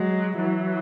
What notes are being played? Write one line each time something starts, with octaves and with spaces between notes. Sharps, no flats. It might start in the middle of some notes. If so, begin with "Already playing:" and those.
Already playing: F#3 G#3
E3 F#3